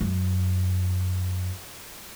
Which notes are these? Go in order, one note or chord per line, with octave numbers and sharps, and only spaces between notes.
F#2